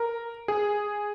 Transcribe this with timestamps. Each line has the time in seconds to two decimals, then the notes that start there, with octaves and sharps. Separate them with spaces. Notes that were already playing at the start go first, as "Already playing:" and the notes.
Already playing: A#4
0.48 G#4